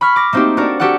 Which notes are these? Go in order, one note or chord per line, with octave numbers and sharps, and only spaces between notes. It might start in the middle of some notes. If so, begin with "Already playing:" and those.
B5 C#6 F6
D6 A#6
A3 A#3 C4 D#4 F#4 G4
D4 F#4 A4 A#4 D5
F#4 G4 A4 A#4 F#5